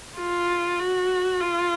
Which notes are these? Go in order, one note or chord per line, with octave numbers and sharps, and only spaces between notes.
F4
F#4
F4